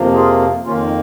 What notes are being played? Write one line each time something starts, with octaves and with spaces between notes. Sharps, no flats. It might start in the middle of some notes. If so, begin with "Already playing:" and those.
Already playing: F2 C3 F3 A#3
F4 G#4
F2 D#3 A#3 C#4 F4